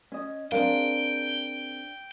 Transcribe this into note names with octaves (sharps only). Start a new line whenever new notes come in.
C#4 D#5
C4 D4 G#4 A#4 F5 G5